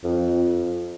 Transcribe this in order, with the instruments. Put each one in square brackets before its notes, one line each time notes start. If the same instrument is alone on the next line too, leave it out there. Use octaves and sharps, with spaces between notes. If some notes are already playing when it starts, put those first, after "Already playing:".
[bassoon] F2